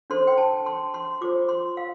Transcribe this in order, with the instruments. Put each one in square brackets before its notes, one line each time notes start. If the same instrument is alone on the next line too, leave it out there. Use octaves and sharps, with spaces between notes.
[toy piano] D4 A4 C5 C6
G5
A5
C6
C6
F4 A4 C5 D6
C6
F5